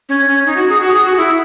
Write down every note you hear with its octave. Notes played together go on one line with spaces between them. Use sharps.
C#4
C#4
D#4
F#4
G#4
F#4
G#4
F#4
E4